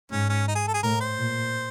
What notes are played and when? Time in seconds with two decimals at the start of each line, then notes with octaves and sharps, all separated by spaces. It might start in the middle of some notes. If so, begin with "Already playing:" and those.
0.11 G#2 C#4
0.30 C#4
0.48 D#4
0.55 G#4
0.67 A4
0.74 G#4
0.83 A2 A#4
1.01 C5
1.18 A#2